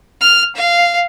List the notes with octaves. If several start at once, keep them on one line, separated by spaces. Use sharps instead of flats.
F6
F5